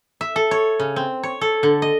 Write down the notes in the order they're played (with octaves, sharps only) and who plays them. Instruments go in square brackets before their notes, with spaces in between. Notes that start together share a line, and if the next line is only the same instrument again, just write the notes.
[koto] E5
A4
C#5
C#3
C4
C#5
A4
D3
D#5